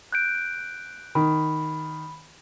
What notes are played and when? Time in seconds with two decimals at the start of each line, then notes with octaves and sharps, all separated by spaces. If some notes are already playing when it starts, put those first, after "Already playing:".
0.12 F#6 G6 D7
1.15 D#3 B5